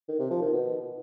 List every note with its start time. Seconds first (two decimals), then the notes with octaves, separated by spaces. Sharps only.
0.08 D#3
0.19 C3
0.30 F3
0.42 D#3
0.53 B2